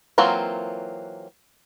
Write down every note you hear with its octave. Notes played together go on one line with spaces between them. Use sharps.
E3 F#3 A#3 C4 F4